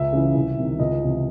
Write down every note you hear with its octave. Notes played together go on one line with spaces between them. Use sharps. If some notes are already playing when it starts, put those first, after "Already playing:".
Already playing: C#2 E5
C#3 E3
C2
C3 D#3
C#2 D#5
C3 E3